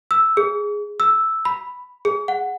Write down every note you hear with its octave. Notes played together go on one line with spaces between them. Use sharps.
E6
G#4
E6
B5
G#4
F#5